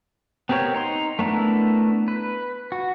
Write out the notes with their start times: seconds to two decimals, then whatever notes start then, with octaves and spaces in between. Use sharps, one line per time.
0.49 B3 C4 G4 A#4 C#5
0.74 D#4 A#5 C6
1.19 A3 B3 D4 E4 A#4
2.08 B4
2.72 F#4